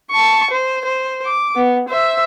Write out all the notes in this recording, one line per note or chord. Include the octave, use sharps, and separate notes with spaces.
A5 C#6
C5
C5
D6
B3
C5 E5